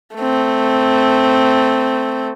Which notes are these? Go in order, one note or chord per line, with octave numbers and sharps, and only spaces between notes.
A3 C4